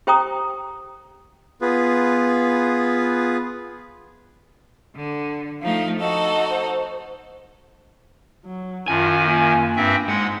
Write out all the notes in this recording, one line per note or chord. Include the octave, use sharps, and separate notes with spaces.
G4 C5 G5 A#5 C#6 D#6
B3 F4 G#4 B4
D3
F3 A3 D#4 F5
D#4 F#4 A4 D#5
C5
F#3
F#2 D#3 F4 G#5 A5
A#3 F4
G2 C4 E5
G#2 G#3 F#5